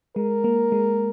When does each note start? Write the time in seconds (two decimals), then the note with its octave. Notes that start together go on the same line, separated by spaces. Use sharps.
0.16 G#3 A#4
0.44 A#3
0.72 G#3